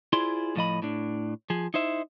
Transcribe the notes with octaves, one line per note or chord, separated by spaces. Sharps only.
E4 F4 G#4 C5 D5 C6
A2 F3 D#5 B5
A2 D4
F3 G#4
D#4 E4 C5 E5